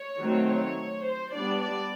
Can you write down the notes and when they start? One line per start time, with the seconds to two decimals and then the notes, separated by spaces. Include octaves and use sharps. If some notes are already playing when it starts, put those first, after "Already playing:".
Already playing: C#5
0.19 D#3 F#3 A3 C4
0.48 C#5
1.05 C5
1.33 G3 B3 D4 D5
1.61 D5